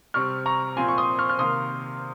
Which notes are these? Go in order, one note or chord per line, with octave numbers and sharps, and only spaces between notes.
C3 G3 C4 C#6 F6
A#5 C#6
A#2 F3 C4 G#5 C6
C#6
C6 D#6
C#6 F6
F6
C3 D#3 A#3 C6 D#6